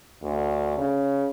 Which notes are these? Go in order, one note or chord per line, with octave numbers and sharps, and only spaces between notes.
D2
C#3